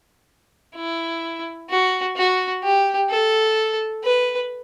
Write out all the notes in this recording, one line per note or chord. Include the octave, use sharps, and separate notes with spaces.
E4
F#4
F#4
G4
A4
B4